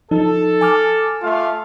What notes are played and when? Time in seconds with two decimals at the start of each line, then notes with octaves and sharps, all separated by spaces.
0.11 F3 D#4 A4
0.61 G#5 D6 F6
1.22 A3 F4 F5